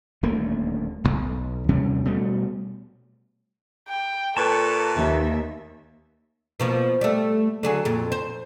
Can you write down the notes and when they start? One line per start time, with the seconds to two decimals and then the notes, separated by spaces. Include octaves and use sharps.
0.23 D#1 D2 A3 A#3
1.04 D#1 B1
1.69 D#2 C3 G3 C#4
2.05 B2 G3 A3
3.89 G5
4.37 A#2 A4 B4 A5 C#6
4.98 D#2 E5
6.60 B2 F3 A#3
7.01 G3 A3
7.63 D3 F#3 G#4
7.85 F2 A#2
8.12 C5